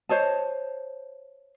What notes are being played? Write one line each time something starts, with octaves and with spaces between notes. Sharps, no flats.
C5 C#5 D#5 A5